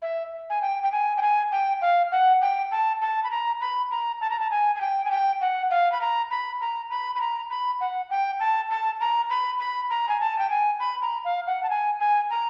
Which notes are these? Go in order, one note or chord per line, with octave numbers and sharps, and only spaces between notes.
E5
G#5
G5
G5
G#5
G5
G#5
G5
F5
F#5
G5
A5
A5
B5
A#5
B5
A#5
A5
A#5
A5
G#5
G#5
G5
G#5
G5
F#5
F5
B5
A#5
B5
A#5
B5
B5
A#5
B5
F#5
G5
A5
A5
A#5
B5
B5
A#5
G#5
A5
G5
G#5
B5
A#5
F5
F#5
A5
G#5
G#5
A#5